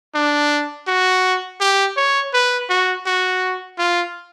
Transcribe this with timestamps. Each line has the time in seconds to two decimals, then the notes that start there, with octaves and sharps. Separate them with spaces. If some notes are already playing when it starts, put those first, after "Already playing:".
0.15 D4
0.87 F#4
1.60 G4
1.97 C#5
2.33 B4
2.69 F#4
3.06 F#4
3.78 F4